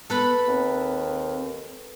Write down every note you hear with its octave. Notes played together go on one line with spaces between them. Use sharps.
B3 A4 B4 B5
D#2 C4